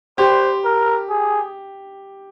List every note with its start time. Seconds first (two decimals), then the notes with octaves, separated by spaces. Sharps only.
0.18 G4 C5
0.65 A#4
1.09 G#4